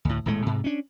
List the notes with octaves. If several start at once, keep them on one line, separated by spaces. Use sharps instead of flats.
D2 A2
D#1 A2 G#3 A3
G#2 C3
C#4 D4